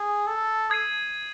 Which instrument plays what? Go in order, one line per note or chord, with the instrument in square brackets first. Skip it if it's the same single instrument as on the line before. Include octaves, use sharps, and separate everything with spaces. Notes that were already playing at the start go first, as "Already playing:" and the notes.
Already playing: [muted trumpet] G#4
A4
[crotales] D#6 G#6 C7 D#7